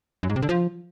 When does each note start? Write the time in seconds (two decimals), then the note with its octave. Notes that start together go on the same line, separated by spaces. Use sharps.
0.23 F#2
0.29 G#2
0.36 C3
0.42 D3
0.49 F3